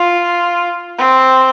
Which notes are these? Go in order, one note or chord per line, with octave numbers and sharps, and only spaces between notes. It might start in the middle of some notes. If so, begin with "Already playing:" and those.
Already playing: F4
C4